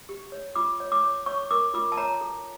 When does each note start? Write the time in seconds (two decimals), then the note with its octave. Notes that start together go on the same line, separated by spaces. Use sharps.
0.09 G4
0.32 C#5
0.55 F4 D6
0.80 C#5
0.92 D6
1.04 C#5
1.26 C#5 C#6
1.51 A#4 D6
1.74 F4 D6
1.92 A5
1.97 C#5 A#5
2.21 A4